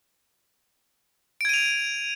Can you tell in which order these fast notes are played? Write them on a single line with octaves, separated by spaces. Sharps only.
D7 G#6 D#7 F7